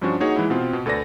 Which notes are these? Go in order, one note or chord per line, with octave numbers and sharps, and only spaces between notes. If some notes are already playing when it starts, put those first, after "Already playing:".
G2 F3 C#4 D4 F#4
A#3 D#4 F#4 G#4 C#5 F#5
E3 G#3 E4
B2 B3 C4 F4
B2
D2 A4 B4 D5 A#6